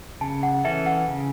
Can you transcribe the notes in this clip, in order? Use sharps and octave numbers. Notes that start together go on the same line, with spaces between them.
C#3 A5
F#5
E3 C#4 A4 E5
F#5
C#3